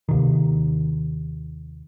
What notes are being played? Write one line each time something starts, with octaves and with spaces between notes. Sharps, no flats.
D#2 C3 D#3